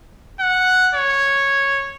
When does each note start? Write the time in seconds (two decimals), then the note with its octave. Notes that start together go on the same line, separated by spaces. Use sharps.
0.40 F#5
0.95 C#5